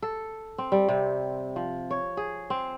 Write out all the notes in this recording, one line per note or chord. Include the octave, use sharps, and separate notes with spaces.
A4
C4
G3
C3
F3
C#5
G#4
C4